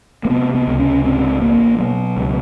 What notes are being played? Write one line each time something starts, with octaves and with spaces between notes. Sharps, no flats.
A#3
C3 B3
B3
C#2
C#4
G#2 C4
A1 A#3
B2 F#3
C#2